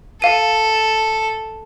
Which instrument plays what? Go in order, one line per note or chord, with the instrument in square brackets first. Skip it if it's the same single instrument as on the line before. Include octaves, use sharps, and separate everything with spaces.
[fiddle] A4 [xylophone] F5 D#7